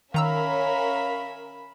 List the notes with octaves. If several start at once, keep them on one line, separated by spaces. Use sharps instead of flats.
D#3 C#4 A#4 E5 F5 A#5 B5 E6